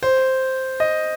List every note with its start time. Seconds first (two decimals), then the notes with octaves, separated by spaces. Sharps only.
0.03 C5
0.80 D#5